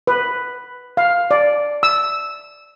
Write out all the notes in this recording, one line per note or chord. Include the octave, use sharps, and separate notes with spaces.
B4
F5
D5
E6